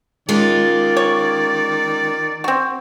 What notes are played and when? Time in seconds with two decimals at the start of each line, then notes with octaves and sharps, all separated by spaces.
0.29 D#3 G#3 C#4 F4 D5
0.97 C#5
2.44 C4 F#4